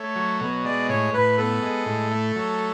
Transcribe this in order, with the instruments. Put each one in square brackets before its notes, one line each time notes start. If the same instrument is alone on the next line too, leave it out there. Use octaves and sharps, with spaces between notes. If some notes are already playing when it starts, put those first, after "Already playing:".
Already playing: [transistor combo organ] A3 [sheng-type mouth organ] C#5
[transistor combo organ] F#3
B2
[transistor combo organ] G#3 [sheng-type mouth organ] D5
[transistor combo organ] A2 [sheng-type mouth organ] C#5
[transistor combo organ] A2 [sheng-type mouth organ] B4
[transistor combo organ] B3 [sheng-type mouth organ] A4
[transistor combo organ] G#3
A2
A3
F#3